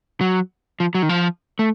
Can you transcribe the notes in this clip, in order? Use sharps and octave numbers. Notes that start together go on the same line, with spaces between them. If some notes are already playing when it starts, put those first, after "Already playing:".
F#3
F3
F#3
D#3
F3
A3